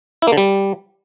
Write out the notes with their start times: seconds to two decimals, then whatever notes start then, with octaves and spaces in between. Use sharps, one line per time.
0.22 E4
0.27 A#3
0.32 D3
0.38 G3